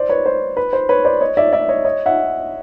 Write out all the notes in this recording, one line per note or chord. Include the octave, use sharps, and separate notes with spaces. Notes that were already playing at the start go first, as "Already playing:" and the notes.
Already playing: C5 D5
B4 C#5
C5
B4
C5
B4 C#5
C5 D5
C#5 D#5
D5 E5
D5 E5
C#5 D#5
C#5 D#5
E5 F#5